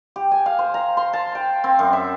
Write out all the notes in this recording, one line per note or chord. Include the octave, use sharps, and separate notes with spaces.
G4
G#5
F5
C5
A#5
C6
A5
G5
C4
F#2
E5